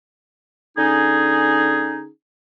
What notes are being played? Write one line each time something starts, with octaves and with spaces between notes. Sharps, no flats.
D3 C#4 D#4 G#4